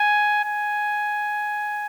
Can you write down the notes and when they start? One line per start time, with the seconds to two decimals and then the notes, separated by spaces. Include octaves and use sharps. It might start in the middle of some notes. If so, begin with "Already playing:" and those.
Already playing: G#5
0.44 G#5